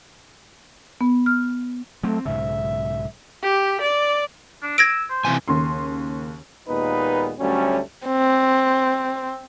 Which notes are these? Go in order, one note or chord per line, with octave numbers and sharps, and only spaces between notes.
B3
F6
F#3 A3 C4
B1 G#2 C#3 E5
G4
D5
D4
E6 G#6 A#6 D7
C5
C3 E3 G#5
D#2 C#3 C6
D#2 A#2 G#3 B3 D#4 B4
D2 F#3 G3 A3 C#4
C4